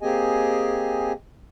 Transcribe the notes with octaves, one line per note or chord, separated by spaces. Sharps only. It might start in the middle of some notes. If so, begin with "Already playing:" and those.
A#3 C4 G4 G#4 D#5 G#5